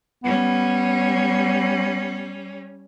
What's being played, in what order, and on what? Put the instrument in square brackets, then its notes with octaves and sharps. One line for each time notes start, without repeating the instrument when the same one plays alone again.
[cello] G3 C#4 [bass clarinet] B3